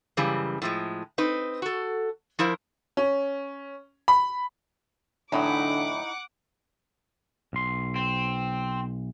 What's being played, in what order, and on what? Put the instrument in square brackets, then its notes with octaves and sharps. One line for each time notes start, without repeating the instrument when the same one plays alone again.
[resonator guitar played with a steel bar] F#2 C#3 E3 G3
A2 F3 G#3
C4 D#4 B4
F#4 A4
F3 E4 A#4 C5
[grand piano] C#4
B5
[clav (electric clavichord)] E2 A2 F#3 [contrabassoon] D3 [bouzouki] D#4 E4 [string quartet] F#5 D6
[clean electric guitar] B1 C6
[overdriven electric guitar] C4